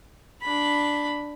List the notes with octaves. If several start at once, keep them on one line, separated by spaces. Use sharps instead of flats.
D4 B5